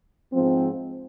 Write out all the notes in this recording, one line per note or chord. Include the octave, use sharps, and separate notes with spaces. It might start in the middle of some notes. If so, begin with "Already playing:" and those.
G#2 F3 G#3 C4